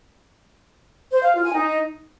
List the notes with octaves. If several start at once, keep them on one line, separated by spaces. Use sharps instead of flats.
C5
F5
F4
G#5
D#4